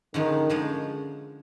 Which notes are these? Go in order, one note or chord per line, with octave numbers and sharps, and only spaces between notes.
D3 D#3 F3 G#3 C#4
D3 F3 G#3 C#4